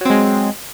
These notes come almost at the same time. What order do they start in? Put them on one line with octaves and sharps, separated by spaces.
F#3 C4 G#3